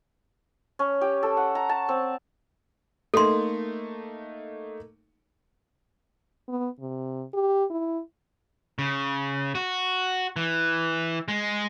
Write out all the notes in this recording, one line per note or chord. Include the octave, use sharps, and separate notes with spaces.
C#4
G4
A4
F#5
A#5
A5
C4
A3 A#3 D#4 A4 C6
B3
C3
G4
E4
C#3
F#4
E3
G#3